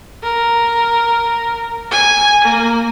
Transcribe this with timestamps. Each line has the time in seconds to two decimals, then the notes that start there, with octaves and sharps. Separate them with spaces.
0.23 A#4
1.91 G#5
2.44 A#3